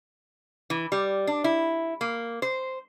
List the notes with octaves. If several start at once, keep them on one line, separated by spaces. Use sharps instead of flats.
E3
G3
D4
E4
A#3
C5